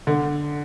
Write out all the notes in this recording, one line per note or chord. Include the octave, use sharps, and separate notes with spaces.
D3